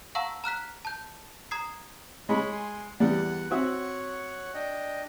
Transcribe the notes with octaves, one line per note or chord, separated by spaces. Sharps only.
F5 F#5 A5 A#5 C#6 E6
A#5 F6 F#6 B6
A5 G6
A#5 D#6 G#6 C7
G#3 C#5 B5
G#5 C6
E2 G3 D5 F#5
C4 F#4 C#5 E5 F#5
D4 D#5 G5